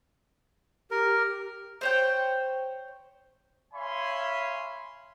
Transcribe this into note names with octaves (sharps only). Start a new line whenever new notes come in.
G4 A#4
C5 C#5 G5
C#5 E5 F5 G#5 B5 C6